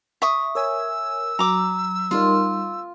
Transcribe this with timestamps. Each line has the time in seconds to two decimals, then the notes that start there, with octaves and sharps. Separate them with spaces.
0.22 E5 C#6 D#6
0.55 A#4 C#5 G#5 E6
1.39 F#3 A#5 D6
2.11 G3 D#4 F4 A#4